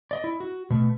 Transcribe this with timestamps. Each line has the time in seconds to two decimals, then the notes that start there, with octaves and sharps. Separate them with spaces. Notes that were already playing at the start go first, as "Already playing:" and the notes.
0.11 D5 D#5
0.24 E4
0.40 F#4
0.70 B2 A3